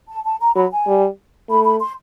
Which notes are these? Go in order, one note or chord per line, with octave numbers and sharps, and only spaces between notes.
A5
A5
A#5
F#3 B5
G#5
G3
A3 B5
B5
C6